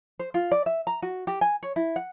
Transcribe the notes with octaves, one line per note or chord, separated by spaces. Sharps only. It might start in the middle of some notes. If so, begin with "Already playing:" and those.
C5
F4
D5
E5
A#5
F#4
G4
G#5
C#5
E4
F#5